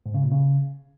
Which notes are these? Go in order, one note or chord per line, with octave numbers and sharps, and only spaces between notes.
G#2
C#3
A#2
C#3